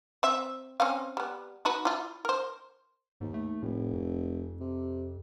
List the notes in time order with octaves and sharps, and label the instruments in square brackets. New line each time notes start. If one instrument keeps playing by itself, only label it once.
[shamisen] C4 E5
C4 C#4 F5
G3 B3
D#4 F#4 B4
E4 F4
A#4 C5
[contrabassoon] D#2 [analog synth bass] G#2
[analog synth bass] A3
[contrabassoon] F1 [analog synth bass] A2
[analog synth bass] F2
[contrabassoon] C3